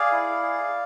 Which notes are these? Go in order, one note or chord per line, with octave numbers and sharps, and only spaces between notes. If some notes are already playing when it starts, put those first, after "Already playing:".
Already playing: G#4 D5 F5
E4
G#4